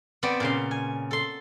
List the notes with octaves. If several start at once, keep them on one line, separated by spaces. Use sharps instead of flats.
B3 C4 C5 D5
A#2 C#3 C6
G#5
A4 C6